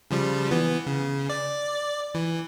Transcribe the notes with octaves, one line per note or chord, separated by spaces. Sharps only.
C#3 F3 G3
E3 B3
C#3
D5
E3